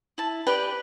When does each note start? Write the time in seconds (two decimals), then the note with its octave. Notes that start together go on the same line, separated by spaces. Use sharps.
0.18 E4 A5
0.47 G4 B4 D5 G5